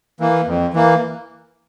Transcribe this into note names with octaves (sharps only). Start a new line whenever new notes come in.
E3 A#3
F2
E3 A#3